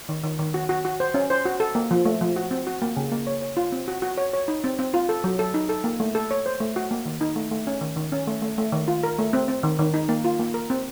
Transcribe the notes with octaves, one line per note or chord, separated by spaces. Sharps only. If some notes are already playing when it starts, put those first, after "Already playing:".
D#3
D#3
D#3
F#4
F#4
F#4
C5
C#4
C5
F#4
A4
A#3
F3
A3
F3
F#4
C4
F#4
A#3
C#3
A#3
C#5
C#5
F4
C4
F#4
F#4
C#5
C#5
D#4
C4
C4
F4
A4
F#3
A4
D#4
A4
A#3
A3
A4
C#5
C5
A3
F#4
A#3
D#3
D#4
A3
A3
C#4
D#3
D#3
C#4
A3
A3
A3
D#3
F4
A#4
A3
C4
C4
D#3
D#3
D#4
A#3
F4
A#3
A#4
C4